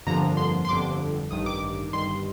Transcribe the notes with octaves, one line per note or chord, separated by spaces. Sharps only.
G1 F2 D3 F3 A#3 A#5
C6
C6
G1 F2 D3 D6
A1 G2 D#3 D#6
D6
G1 G2 D#3 C6